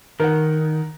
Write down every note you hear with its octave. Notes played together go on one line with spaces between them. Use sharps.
D#3 A#4 F#5